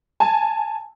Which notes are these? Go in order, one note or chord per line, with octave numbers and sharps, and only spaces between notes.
G#5 A5